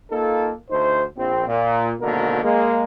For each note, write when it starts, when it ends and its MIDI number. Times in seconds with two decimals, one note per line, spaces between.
0.11 0.51 58
0.11 0.51 63
0.11 0.51 65
0.11 0.51 69
0.70 1.02 38
0.70 1.02 63
0.70 1.02 72
1.17 1.42 34
1.17 1.42 60
1.47 1.92 46
2.01 2.43 32
2.01 2.43 47
2.01 2.43 50
2.01 2.43 58
2.01 2.43 70
2.43 2.84 56
2.43 2.84 58